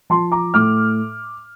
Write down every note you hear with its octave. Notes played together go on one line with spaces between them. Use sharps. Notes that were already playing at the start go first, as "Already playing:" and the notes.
F3 A5 C6
A#5 D6
A2 D6 F6